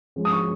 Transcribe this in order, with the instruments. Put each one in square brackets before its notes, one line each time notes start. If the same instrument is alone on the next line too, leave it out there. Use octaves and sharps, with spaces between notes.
[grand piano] F3 G#3 C#4
[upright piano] D#6
C#6